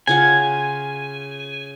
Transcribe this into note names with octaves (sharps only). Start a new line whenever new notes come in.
C#3 F4 F#5 G#5